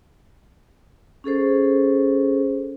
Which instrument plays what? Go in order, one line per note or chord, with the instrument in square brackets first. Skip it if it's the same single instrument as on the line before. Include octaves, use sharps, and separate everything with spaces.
[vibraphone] C#4 G#4 A4 C5